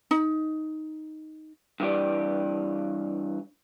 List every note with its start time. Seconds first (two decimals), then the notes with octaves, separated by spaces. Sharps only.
0.11 D#4
1.80 G2 E3 G4 D5